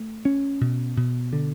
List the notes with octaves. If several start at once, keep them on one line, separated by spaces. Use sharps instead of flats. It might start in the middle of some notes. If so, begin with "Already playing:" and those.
Already playing: A3
C#4
B2
B2
D3